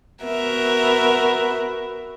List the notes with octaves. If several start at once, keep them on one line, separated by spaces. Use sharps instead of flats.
B3 F#4 A#4 E5